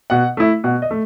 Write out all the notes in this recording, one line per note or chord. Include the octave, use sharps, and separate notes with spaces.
B2 F#5
A3 E4
B2 F#5
D#5
A3